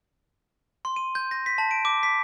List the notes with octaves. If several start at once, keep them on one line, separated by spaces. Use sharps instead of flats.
C6
D#7
G6
A#6
B6
A5
D7
D6
B6